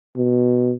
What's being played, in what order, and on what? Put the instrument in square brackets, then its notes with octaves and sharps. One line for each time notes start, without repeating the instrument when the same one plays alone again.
[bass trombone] B2